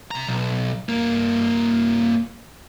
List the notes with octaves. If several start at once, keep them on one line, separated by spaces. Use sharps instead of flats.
C3 A#5
B1
G2 A#3